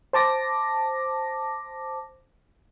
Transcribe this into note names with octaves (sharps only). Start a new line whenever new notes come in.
C5 A5 D6 A#6